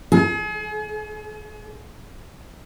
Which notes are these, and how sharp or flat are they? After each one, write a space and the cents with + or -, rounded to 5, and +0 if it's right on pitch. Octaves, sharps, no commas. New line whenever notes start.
G#4 +40